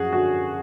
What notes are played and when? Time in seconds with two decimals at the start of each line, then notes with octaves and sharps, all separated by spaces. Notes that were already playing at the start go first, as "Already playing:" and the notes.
Already playing: F#2 F3 F#4 G#4
0.13 D3 F#4